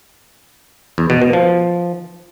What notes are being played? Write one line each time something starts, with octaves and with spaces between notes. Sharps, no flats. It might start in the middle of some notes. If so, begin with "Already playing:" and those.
E2
B2
B2
F3